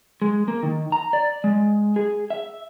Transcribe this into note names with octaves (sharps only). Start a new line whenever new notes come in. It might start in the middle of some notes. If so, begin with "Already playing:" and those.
G#3
A#3
D#3
A#5
D5
G#3
G#4
E5